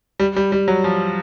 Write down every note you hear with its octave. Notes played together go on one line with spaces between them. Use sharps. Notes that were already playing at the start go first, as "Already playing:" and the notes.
G3
G3
G3
F#3
F3